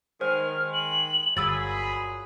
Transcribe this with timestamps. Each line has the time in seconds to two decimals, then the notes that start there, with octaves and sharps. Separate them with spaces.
0.21 D#3 G#3 C5 F6
0.73 F#7
1.37 G1 A#2 F#3 G#4 B5 D#6 E6 A6